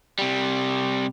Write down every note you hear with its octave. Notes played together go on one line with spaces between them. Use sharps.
C3 G3